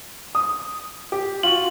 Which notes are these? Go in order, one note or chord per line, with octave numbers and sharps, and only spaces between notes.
D#6
G4
F4 F#4 F#7